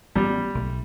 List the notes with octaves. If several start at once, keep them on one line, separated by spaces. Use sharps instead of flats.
A1 F3 G3 B3
B1 A3